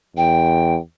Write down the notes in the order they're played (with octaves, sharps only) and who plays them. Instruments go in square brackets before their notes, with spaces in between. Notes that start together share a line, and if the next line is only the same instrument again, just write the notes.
[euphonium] E2 [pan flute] G5